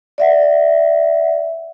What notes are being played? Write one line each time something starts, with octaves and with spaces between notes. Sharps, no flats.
D5 E5 F#5